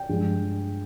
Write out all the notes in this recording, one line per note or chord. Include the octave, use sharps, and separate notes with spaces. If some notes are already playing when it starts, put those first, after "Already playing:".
Already playing: G5
G2 F3 G#3